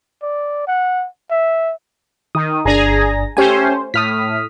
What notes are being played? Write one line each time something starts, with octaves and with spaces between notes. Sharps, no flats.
D5
F#5
E5
D#3 D#6
G1 D4 G#4 G#5 A#5 A#6
A3 C#4 G4 C5 G#5
A2 D#6 F6 B6